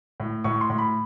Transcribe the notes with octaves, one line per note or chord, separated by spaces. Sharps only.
A2
A2 C#6
C6
A2
B5